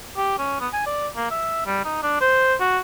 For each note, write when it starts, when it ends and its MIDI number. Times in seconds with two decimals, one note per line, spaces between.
0.17 0.36 67
0.38 0.57 61
0.60 0.68 59
0.73 0.83 80
0.86 1.08 74
1.16 1.31 58
1.31 1.63 76
1.66 1.81 55
1.84 2.02 63
2.03 2.19 62
2.21 2.55 72
2.60 2.79 66